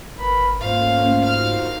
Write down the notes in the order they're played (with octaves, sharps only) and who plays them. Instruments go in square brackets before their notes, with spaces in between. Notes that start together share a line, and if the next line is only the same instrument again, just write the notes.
[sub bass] G1 [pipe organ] A#4 B4 B5
[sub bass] G#2 [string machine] A3 A#3 C#4 [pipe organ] F4 C5 [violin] F5
[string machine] D#4 F#4 A#4 [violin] F5 F6